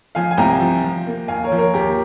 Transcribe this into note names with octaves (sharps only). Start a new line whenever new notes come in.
F3 F5 G#5
G#5
C2 G5 A#5
F3
F3
A#3
D#2 F5 G#5
A#4 C#5
F3
A#4 C#5
D#2 G4 A#4